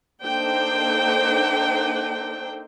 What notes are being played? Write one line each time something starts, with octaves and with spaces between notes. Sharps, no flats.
A#3 D4 D#4 A4 C5 G5